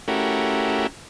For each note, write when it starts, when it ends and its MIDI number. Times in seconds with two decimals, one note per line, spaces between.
0.08 0.87 57
0.08 0.87 61
0.08 0.87 64
0.08 0.87 66
0.08 0.87 67
0.08 0.87 70